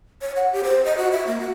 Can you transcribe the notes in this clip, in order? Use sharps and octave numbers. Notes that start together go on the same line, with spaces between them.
C#5
F#5
G4
C5
D#5
F#4
E5
A#3
F#4